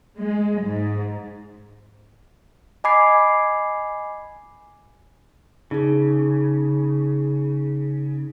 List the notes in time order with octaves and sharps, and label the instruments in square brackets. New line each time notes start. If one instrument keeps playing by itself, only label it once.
[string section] G#3
G#2
[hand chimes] D#5 G#5 B5 D6 G#6 C7
[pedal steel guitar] C#3 [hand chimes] D#4 G#4